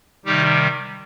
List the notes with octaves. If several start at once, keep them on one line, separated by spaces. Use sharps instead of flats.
C3 D#3 G3 D#4 G4